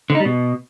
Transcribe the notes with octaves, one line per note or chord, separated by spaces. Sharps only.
D3
D#4
G3
B2